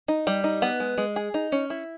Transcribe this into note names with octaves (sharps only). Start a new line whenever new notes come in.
D#4
G3
D#4
B3
G#3
G#3
G#4
D#4
C#4
E4